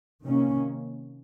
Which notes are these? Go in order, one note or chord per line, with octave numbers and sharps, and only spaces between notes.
C3 D#3 A#3 C#4